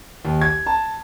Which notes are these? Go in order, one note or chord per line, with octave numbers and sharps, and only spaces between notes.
D#2
G#6
A5